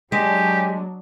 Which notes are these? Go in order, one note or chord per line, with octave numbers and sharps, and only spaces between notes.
F#3 G#3 D4 G4 G#5